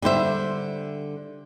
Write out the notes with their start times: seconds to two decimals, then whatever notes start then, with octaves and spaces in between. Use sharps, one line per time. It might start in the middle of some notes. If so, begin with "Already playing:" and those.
0.02 D3 G3 C5 E5